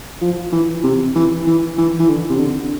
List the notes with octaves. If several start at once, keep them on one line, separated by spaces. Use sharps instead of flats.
F3
E3
C3
E3
E3
E3
E3
D3
C3
D3